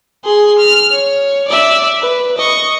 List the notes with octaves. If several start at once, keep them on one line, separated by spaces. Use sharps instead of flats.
G#4 C6
F6
C#5
D5 E5
B4
D#5 C#6